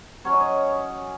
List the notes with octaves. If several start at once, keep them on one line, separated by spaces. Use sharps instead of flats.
F#3 C#4 C#5
D#5
C#5